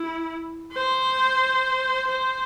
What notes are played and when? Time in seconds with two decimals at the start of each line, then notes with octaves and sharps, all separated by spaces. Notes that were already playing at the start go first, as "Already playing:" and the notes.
Already playing: E4
0.73 C5
2.07 C5